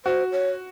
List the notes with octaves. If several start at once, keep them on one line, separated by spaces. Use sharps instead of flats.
F#4 C5
C#5